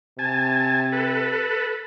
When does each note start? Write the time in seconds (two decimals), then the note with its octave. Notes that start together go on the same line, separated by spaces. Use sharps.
0.19 C3 G#5 A5
0.93 A4 B4